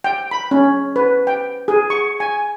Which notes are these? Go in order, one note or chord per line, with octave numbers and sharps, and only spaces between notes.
G5
B5
C#4
B4
G5
G#4
C#6
G#5